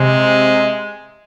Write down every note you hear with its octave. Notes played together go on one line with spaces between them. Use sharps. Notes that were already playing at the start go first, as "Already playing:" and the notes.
Already playing: C3 G#3